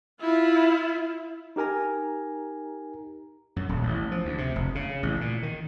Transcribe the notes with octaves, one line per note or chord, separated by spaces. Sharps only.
E4 F4
D#4 G4 A#4 G#5 A#5
F#2
D#1
A1
F3
D2
C3
F1
C#3
A1
A#2
D#3